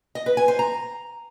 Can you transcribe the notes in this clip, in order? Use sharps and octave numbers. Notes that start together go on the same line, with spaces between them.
D#5
B4
G#5
C5
A#5